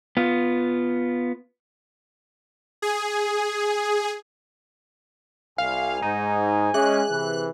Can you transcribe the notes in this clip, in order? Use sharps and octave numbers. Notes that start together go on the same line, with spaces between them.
B3 F4
G#4
C2 F5 G#5
G#2 D#4 D#7
G#3 C#4 G#4 E5 D6 F#6
C3 E3